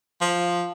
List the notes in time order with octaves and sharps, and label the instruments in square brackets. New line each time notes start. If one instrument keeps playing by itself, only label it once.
[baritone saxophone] F3